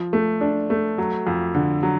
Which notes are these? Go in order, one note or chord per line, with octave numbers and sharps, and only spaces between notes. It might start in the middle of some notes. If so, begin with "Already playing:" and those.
Already playing: F3
A3
D4
A3
F#3
F2
D3
F#3